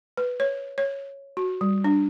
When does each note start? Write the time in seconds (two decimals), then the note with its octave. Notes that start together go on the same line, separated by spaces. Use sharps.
0.17 B4
0.40 C#5
0.78 C#5
1.37 F#4
1.61 G3
1.84 D4